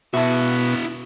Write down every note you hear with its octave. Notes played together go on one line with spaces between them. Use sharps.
B2 E4 F#4 E5 A5